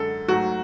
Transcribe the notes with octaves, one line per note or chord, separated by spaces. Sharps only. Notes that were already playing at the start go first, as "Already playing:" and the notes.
Already playing: F#2 D3 G#3 A4
G#2 F#3 A3 F#4